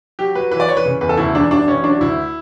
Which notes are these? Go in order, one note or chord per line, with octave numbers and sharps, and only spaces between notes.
F#3 G4
F#3 B4
E3 B4
D5
E3 C#5
B4
C#3
E2 B4
A4
D2 E4
E1 D4
A1 D4
A1 C#4
F#3 D4
D2 E4